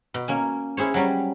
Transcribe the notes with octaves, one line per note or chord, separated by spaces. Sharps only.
B2
A#3 C#4 G#5
C#4 E4 G#4 C5 C#5
F#3 G3 C#4